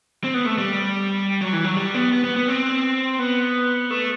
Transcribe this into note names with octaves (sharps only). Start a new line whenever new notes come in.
C4
B3
A3
G3
F#3
E3
F#3
G3
B3
B3
B3
B3
C4
B3
A3